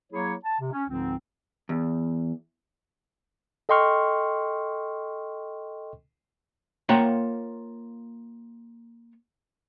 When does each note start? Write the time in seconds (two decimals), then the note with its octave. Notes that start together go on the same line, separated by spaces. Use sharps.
0.12 F#3 A#3 E4 G#4 C#5
0.45 A5
0.60 C3
0.72 C#4
0.89 C#2 G#2 D3 F3 C4
1.69 E2
3.69 A4 D#5 G5 C6 C#6 F6
6.89 A#3 F4 C#5 F#5 G5 A#5